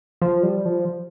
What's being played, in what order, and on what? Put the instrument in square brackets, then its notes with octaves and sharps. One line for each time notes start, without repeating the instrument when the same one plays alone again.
[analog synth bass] F3
G3
F3